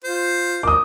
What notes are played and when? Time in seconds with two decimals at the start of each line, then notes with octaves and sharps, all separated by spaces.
0.04 F4 C5
0.63 A#4 D6 D#6